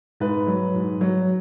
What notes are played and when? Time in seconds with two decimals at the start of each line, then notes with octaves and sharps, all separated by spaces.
0.20 G#2 B4
0.47 F#3
0.75 G#2
1.01 F#3